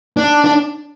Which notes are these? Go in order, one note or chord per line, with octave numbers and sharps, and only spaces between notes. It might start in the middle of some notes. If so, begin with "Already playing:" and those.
D4
D4